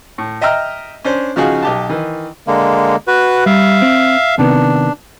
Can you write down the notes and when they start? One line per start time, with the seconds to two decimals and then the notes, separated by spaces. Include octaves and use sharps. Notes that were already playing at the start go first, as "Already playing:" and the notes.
0.18 A2
0.41 D#5 E5 G5 A#5 F6
1.05 C#4 D4 C5
1.36 C#3 F3 D#4 F#4 G#4
1.63 B1 G4 A5
1.89 D#3 E3
2.47 D3 G#3 A#3
3.08 F#4 B4
3.46 G3 E5 F5
3.82 C4
4.38 C3 D#3 B3 D4